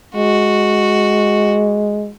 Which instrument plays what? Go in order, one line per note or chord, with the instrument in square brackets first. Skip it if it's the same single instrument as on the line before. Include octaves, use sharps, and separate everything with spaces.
[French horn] G#3 [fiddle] F#4